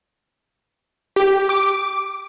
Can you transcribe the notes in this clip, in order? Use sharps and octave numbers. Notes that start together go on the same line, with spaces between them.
G4
D6